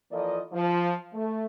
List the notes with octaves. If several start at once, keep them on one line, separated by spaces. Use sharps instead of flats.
E3 F3 A#3 A4 D5 D#5
F3
A3